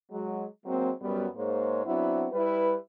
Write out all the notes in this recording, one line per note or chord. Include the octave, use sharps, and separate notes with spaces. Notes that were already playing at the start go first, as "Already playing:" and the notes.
F#3 G#3
F#3 G#3 A#3 C4
F#2 F#3 G3 B3
G#2 G#3 A#3 C5 C#5
F#3 B3 C4 D4 E4
G3 E4 B4